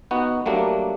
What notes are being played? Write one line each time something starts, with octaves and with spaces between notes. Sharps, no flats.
B3 D#4 F#4
F#3 G3 A3 A#3 D4